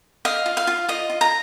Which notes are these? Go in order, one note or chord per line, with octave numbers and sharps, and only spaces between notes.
D#5 F5
F4
F5
F4
F4 D#5
F4
A#5